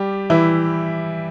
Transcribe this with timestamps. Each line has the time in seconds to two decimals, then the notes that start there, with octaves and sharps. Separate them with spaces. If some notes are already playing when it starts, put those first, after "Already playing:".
Already playing: G3 G4
0.30 E3 E4